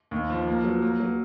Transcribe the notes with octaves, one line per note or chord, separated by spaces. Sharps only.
D#2
F3
A#3
F#3
A#3
F#3